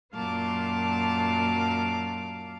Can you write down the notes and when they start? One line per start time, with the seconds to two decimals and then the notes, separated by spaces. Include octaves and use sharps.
0.14 F#2 A#2 F#3 F5 A5 D6